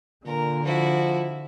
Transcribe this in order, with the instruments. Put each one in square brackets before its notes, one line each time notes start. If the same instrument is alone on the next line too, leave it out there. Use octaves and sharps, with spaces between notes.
[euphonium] A#2 [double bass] D3 [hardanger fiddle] A#4
[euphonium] F3 [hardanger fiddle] E4 F#4